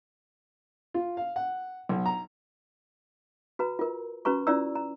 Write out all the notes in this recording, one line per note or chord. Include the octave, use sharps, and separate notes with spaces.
F4
F5
F#5
B1
A#5
F#4 B4 A#5
F4 A#4
C#4 F#4 B4 A#5 C#6
C#4 E4 F4 D5 A#5 E6
A#5